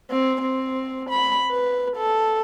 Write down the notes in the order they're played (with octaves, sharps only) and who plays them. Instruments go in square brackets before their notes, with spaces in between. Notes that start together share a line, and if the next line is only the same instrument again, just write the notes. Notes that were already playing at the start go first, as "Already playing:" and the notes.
[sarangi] C4
C4
B5
B4
A4